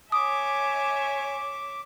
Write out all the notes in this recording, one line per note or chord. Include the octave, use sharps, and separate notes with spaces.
C#5 E5 G#5 D6 D#6